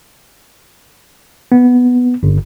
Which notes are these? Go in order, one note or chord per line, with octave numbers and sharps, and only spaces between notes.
B3
G1